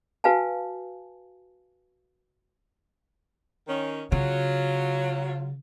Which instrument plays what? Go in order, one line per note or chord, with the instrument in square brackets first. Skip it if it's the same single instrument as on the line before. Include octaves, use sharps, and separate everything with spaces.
[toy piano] F#4 B4 F5 G#5 A5
[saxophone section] D#3 C#4
[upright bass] C#3 [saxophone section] F#3 F4